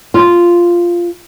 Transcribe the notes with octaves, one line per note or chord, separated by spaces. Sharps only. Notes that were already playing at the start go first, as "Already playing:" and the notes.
F4